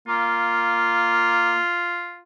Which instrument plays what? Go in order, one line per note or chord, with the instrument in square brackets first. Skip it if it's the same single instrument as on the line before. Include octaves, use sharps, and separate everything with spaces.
[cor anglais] A#3 [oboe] F4